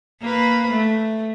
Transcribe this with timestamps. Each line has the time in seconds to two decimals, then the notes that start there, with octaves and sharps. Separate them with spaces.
0.21 A#3 B4
0.70 A3